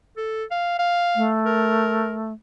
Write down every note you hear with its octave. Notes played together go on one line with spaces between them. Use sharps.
A4
F5
F5
A3
A#4